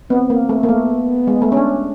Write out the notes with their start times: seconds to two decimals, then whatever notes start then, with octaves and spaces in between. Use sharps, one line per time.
0.10 B3 C4
0.30 A#3
0.49 A3
0.63 A#3
0.69 A3 B3
1.27 G#3
1.42 A3
1.52 C#4
1.57 D4